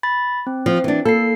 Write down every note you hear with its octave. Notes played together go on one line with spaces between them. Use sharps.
B5 A6
C4
F3
E3 D4
A#3 A4 C7